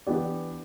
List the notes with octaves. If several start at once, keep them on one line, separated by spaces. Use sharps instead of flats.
E3 B3 D4 G4 D5